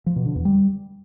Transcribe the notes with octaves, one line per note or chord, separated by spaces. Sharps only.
F3
B2
D3
E2
G3